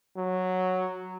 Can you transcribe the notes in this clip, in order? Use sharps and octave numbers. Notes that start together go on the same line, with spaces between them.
F#3